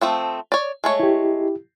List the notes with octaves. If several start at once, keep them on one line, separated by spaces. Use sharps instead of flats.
F3 A3 C4
C#5 D5
G#3 A3 C#5
E4 G4